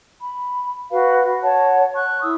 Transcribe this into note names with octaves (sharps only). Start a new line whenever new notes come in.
B5
F#4 B4 F5
C#5 F#5 A5
C#6 F#6
E4 D#6 E6